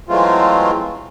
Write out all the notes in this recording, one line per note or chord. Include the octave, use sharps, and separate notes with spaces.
E3 F#3 G#3 A3 C4 F4